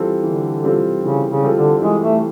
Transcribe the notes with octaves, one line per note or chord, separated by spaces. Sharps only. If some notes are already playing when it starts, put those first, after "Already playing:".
Already playing: E3 G3 C4 F4 A4
D3 E3
G3 C4 F4 A4
C#3 E3
C#3
G3 C4 F4 A4
D3
E3 G#3
A3